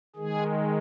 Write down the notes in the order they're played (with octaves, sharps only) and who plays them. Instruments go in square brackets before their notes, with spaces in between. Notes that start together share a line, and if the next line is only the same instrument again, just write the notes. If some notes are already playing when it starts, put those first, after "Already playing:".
[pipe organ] D#3 G#3 G#4